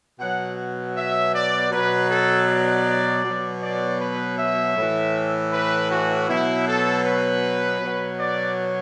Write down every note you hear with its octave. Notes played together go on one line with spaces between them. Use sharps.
B2 F#3 F#5
E5
D5
B2 F#3 B4
A4
D5
B2 F#3
D5
B4
E5
A2 E3
B4
F#4
B2 F#3 E4
A4
B4
B2 F#3
D5